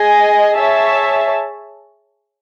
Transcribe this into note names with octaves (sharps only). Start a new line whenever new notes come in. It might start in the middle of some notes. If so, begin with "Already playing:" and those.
Already playing: G#4 D#5 G#5
G#4 C#5 E5 A5